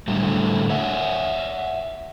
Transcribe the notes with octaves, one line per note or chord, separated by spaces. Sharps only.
A2 D3 F#3 G3 A3
C#5 E5 F#5